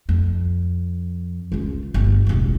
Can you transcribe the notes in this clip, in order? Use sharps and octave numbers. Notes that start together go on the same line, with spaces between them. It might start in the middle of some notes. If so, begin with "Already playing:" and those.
F2
C#2 F4
G1 F4
E1 A1